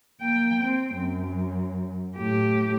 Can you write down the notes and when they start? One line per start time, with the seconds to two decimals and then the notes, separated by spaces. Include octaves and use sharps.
0.21 A#3 G5
0.63 C4
0.95 F#2
2.17 A2 G4